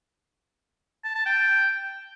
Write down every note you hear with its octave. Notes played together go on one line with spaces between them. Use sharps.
A5
A5
G5